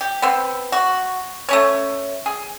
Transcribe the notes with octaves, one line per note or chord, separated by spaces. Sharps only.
G4
B3 C4
F#4
A3 C#4 C#5
G#4